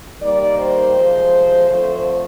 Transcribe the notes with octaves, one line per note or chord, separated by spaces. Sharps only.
D#3 G3 A#3 D5
C5
C3 F3 G#3 C4
D3 F3 A3 C4 C5